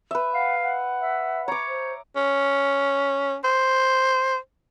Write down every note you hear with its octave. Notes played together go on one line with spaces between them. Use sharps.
B4 E5
F5 F#5
F#5
E5
C#5 A#5 D6
C5
C#4
C5